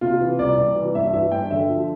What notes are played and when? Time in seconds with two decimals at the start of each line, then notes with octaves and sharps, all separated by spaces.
0.01 C3 F4
0.20 E3
0.39 C2 D5
0.58 C2
0.76 E3
0.94 G2 E5
1.13 E3 E5
1.32 G2 G5
1.51 D3 E5
1.69 F3